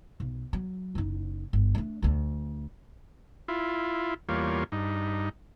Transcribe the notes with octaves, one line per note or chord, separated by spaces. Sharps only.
B1
F#3
F#1 D#4
G1
A3 D4
D2 D3
E4 F4
E2 G3 A#3 F4 C#5
G2 D#4